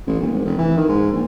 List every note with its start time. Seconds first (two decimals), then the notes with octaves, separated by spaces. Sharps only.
0.07 A1
0.20 D#1
0.32 G#1
0.45 F1
0.58 E3
0.77 D#3
0.89 G#2
1.12 A#1